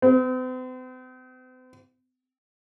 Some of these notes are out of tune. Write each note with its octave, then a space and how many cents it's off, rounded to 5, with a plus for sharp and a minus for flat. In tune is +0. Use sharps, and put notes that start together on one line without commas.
C4 -45